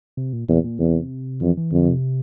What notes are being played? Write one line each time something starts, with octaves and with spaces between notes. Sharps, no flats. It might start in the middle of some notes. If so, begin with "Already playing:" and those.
C3
A#2
E2 A#2
A#2
E2 C3
F2 E3
E3
F2 D3
C3